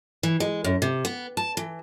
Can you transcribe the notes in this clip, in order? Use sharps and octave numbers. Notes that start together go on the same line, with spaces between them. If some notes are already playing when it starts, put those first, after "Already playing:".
E3
G#3
F#2
C3
B3
A5
E3